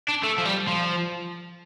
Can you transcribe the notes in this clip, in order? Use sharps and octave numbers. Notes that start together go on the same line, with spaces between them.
D4
A3
F3
G3
F3